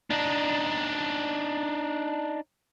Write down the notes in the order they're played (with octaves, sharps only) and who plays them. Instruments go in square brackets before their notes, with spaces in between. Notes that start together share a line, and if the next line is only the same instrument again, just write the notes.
[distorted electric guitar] D4 D#4